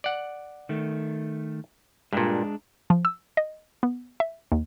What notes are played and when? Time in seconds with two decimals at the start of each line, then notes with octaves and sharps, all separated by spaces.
0.04 D5 F#5
0.69 D#3 A3
2.13 G2 A#2 G#3 D4
2.90 F3
3.05 E6
3.37 D#5
3.83 B3
4.20 E5
4.52 D#2